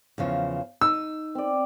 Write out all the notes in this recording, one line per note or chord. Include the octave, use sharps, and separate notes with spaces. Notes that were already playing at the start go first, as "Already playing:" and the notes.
E2 C#3 F3
D#4 E6
C4 D5